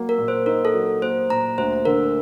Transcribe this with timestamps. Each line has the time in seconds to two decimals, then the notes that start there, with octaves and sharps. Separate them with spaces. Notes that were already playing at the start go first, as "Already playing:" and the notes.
Already playing: F#3 A#3
0.09 A#4
0.18 A#2
0.28 C5
0.46 D#4 A#4
0.65 A4
0.74 F#3
1.02 A#3 C5
1.30 A#2 A#5
1.58 D2 C5
1.85 D3 A#4